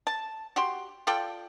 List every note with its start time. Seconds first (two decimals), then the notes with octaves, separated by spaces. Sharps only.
0.07 A5
0.56 F#4 G4 C6
1.07 F4 A4 D5 G5